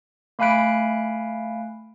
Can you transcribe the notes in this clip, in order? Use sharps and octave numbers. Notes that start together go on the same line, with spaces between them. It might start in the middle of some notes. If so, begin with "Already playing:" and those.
A3 F5 G#5 B5 F#6 D7